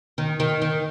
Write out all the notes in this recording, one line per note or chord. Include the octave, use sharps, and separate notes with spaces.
D#3
D#3
D#3